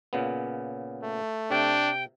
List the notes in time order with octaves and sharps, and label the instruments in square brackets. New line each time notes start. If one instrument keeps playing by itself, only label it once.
[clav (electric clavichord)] A#2 C#3 B3
[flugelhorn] A3
[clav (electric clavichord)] C3 [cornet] D4 [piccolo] G5